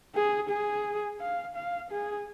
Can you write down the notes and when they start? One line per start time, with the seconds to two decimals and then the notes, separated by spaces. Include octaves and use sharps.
0.15 G#4
0.49 G#4
1.20 F5
1.55 F5
1.91 G#4